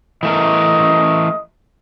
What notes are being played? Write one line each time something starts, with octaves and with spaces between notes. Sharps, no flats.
E3 A3 A#4 D#5